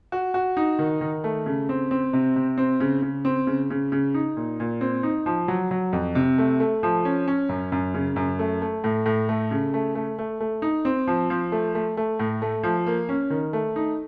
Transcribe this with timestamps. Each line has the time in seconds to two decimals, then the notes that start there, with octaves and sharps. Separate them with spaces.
0.12 F#4
0.34 F#4
0.57 D#4
0.79 D#3
1.01 D#3
1.24 A3
1.46 C#3
1.69 C4
1.91 C4
2.13 C3
2.36 C3
2.58 C4
2.80 C#3
3.02 C#3
3.25 C4
3.47 C#3
3.70 C#3
3.92 C#3
4.14 D#4
4.36 A#2
4.60 A#2
4.81 C4
5.03 D#4
5.26 F3
5.48 F#3
5.71 F#3
5.93 F2
6.15 C3
6.38 A3
6.60 A3
6.83 F3
7.05 C#4
7.28 C#4
7.49 F#2
7.72 F#2
7.94 C#3
8.16 F#2
8.39 A3
8.62 A3
8.84 A2
9.06 A2
9.29 A3
9.51 C#3
9.74 A3
9.95 A3
10.18 A3
10.40 A3
10.62 D#4
10.85 C4
11.07 F3
11.30 F3
11.52 A3
11.75 A3
11.97 A3
12.19 A2
12.42 A3
12.63 F3
12.86 A#3
13.09 C#4
13.30 D#3
13.53 A3
13.76 D#4